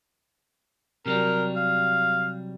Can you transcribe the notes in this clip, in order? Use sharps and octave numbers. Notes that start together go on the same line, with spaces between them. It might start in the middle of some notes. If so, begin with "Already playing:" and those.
C3 F#3 G3 A#4
F5